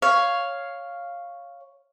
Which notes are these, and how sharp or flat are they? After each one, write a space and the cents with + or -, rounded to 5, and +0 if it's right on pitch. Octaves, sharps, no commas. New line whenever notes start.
C#5 +0 F5 +0